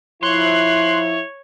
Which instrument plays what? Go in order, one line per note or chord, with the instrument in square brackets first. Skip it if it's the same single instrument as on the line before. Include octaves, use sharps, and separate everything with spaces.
[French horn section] F3 E4 [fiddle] C#5 [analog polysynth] C6 F#6